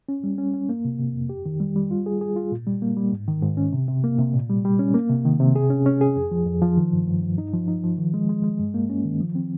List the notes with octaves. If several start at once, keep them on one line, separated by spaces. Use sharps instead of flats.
C#4
G3
C#4
C#4
A#3
C3
C3
F2
G4
D#3
G3
G3
F4
G#4
G#4
F4
A#2
G3
A#3
G3
G#2
D#3
G#2
C#4
C3
C3
A#3
C3
A#2
G3
G3
C#4
A#3
C3
D#3
C3
G#4
C#4
C#4
G#4
F2
F3
F2
F3
D#3
G2
G2
G2
D#4
F3
D#4
F3
D#3
G#3
G#3
G#3
G2
A#3
C#4
D#3
F3
C4